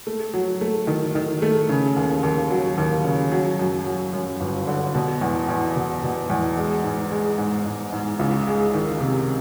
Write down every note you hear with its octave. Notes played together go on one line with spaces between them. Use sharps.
A3
F#3
A3
D#3
D#3
A3
C#3
D#2
D#2
F#3
D#2
C#3
F#3
F#2
F#3
F#2
G1
D3
B2
E2
E2
B2
B2
E2
G#3
G#2
G#3
G#2
G#2
G#2
C#2
G#3
D#3
C3